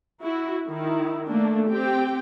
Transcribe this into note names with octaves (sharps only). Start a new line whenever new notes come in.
E4 F#4
D#3 E4
A3 A#3 D4
C4 G4 G5